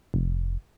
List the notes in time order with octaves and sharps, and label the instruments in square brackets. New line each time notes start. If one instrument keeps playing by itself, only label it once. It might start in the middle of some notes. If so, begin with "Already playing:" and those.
[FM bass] F1